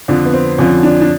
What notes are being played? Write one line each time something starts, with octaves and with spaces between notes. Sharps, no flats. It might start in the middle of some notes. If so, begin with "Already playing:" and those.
F2 D3 F3 D4
B3
C4
F2 D3 F3 C#4
D4
D4